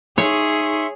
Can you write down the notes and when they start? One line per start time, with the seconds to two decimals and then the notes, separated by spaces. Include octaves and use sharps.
0.18 D#4 G#4 C#5 E5 C6 C#6